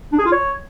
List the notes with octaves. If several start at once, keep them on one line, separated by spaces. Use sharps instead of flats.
D4
G#4
F4
C#5